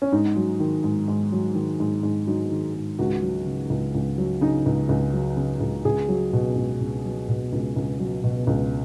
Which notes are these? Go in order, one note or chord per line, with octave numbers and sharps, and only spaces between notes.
C#4
G#2 D#4
F#3
D#3
G#2
G#2
F#3
D#3
G#2
G#2
F#3 D#4
D#3
G#2
C#2 F#4
F#3
C#3
C#2
C#2
F#3
C#3 D#4
C#2
C#2
F#3
C#3
C#2
C#2 G#4
F#3
B2
C#2
C#2
F#3
B2
C#2
C#2
F#3
B2
C#2